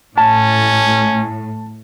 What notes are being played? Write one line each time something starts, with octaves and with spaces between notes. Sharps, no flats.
A2 C#4 A5